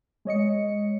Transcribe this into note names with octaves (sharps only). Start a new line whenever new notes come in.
G#3 C#5 D#5 C#7